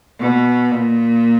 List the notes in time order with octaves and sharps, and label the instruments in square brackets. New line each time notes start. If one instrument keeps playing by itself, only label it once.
[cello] B2
A#2